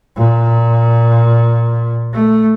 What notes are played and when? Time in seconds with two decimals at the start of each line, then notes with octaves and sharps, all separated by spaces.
0.17 A#2
2.13 A3